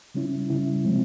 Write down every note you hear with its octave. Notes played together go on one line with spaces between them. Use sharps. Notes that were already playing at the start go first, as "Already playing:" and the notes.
C#3 G3 C#4 E4
C#3 G3 C#4 E4
C3 F3 G#3 C4